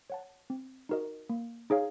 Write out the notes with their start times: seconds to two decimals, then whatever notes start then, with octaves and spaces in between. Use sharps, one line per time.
0.10 C#5 F#5 A5
0.50 C4
0.89 D#4 F#4 A#4 D#5
1.30 A#3
1.70 D#4 G#4 C#5 F5